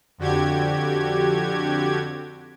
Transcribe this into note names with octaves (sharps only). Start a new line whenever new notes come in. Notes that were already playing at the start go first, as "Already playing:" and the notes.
F2 D3 F#4 G4 G#6